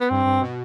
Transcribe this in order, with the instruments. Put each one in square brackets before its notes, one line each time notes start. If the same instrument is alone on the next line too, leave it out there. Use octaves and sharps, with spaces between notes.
[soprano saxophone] B3
[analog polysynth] G2 [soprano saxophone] C4
[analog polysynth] G2
B2